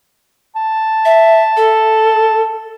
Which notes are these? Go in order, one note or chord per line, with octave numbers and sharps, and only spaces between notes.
A5
E5
A4